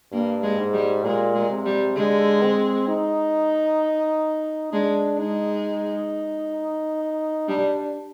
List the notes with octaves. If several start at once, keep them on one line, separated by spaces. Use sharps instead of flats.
G2 A#3
G#3
G#2
G3
A#2 G#3
G#3
C3
G3
D3 G#3
C4
D#4
G#3 D4
G#3 D#4
G3 D4